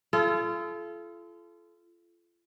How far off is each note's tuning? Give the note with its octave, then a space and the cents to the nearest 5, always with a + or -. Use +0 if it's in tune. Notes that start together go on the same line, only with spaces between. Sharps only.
F4 -35 A4 -35